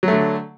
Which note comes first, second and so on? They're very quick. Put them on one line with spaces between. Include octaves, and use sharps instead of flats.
F#3 A3 D3